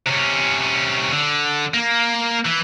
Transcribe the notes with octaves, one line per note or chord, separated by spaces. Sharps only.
C3 C#4
D3
A#3
E3